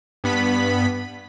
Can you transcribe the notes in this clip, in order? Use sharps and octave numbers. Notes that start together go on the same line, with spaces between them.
G2 B3 B5 B6